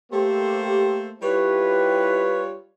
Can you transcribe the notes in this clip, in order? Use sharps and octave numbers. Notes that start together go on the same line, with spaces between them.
A3 A#3 G4 A4 C5
G3 E4 F4 G4 B4 C#5